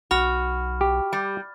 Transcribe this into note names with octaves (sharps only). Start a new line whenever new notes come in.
B1 F#4 B5 F6
G4
G3